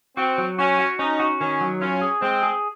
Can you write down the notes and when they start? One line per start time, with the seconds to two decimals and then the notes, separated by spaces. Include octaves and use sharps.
0.17 C4 F#4
0.38 F#3
0.59 C#4 F#4
0.79 F#4
0.99 C#4 D#4
1.20 F#4
1.40 D#3 C#4
1.61 F#3
1.81 C#4 F4
2.01 G#4
2.22 G#3 C4
2.43 G#4